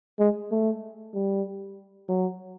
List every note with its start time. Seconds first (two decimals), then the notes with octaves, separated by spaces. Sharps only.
0.19 G#3
0.51 A3
1.14 G3
2.09 F#3